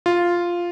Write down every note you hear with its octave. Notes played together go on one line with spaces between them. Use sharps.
F4